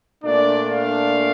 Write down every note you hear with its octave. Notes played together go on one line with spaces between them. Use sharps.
A#2 A3 D4 D5
F5